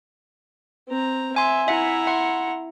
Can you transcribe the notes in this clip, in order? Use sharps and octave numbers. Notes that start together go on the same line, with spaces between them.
C4 A#5
E5 G#5 C6
E4 E5 F#5 G#5 A#5
F#5 C6